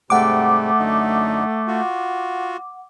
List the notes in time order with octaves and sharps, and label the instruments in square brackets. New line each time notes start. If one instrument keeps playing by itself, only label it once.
[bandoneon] G#2 C3 G3 [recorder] A3 [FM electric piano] F#5 D6
[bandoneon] F#2 D3 D#4
F4 F#4